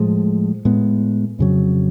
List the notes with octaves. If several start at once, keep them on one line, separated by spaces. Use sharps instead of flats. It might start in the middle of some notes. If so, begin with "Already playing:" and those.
Already playing: A2 F3 G#3
A2 G#3 B3
F2 C#3 F#3